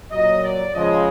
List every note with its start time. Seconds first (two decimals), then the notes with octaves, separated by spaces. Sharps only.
0.11 A#2 F#3 D#5
0.43 D5
0.73 C#3 F3 G#3 D#5